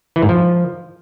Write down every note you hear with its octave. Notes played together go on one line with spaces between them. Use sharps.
E3
G#2
F3